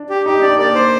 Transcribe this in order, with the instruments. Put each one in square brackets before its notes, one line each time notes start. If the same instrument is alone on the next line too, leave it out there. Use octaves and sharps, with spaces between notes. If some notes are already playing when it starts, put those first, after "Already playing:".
Already playing: [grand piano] D4
[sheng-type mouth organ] G4
[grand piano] D#4 [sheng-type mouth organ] G4
[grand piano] D4 [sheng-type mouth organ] D5
[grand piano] A#3 [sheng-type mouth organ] D5
[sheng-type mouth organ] C5